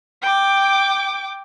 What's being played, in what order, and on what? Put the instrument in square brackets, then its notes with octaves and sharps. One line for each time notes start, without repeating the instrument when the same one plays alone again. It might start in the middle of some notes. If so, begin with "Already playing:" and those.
[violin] G5 D6